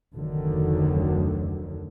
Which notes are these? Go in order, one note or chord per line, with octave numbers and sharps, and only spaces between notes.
F1 D2 D3 D#3 F#3